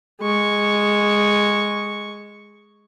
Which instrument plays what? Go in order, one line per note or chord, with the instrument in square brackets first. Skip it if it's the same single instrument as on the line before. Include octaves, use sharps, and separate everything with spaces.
[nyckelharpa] G#3 C#6